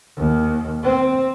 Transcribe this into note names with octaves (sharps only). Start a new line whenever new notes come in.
D#2
C4